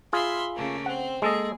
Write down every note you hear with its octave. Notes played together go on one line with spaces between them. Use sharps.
F4 G#4 E5 B5 C6
C#3 A3 A#3
C4 F#5
G#3 A#3 G#4 A4 D#5